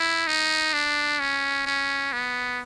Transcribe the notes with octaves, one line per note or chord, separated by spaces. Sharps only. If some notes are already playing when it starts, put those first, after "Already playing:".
Already playing: E4
D#4
D4
C#4
C#4
B3